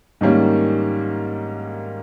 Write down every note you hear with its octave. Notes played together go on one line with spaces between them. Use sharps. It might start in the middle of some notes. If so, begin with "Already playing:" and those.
G#2 D#3 G3 A#3 C#4